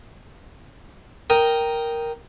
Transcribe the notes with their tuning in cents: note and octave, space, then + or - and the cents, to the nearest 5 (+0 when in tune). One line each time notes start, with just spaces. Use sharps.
A#4 +0 G5 +0 D#6 +0